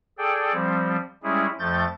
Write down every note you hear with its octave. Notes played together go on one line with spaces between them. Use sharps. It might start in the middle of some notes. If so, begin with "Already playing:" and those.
G#4 A4 D5 G5
F3 G3 C4
G3 G#3 C#4 E4 G#4
F2 F3 A3 G6 A6